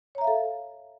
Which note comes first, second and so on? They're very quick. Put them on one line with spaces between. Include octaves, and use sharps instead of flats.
C#5 A#5 E5 F5 A4